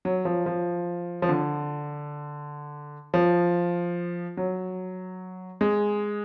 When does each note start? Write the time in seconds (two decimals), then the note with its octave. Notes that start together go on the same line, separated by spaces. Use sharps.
0.05 F#3
0.25 F3
0.46 F3
1.22 F3
1.29 D3
3.14 F3
4.37 F#3
5.61 G#3